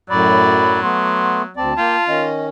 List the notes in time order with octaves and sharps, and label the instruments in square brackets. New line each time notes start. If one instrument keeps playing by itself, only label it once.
[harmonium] F#2 A2 D5 [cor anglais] F#3 [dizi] B5
[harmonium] A3 B3 [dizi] C6
[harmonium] D2 C4 D5 [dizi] A5
[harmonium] A#3 G5 [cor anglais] F4
[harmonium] D#3 C#4 [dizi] D#5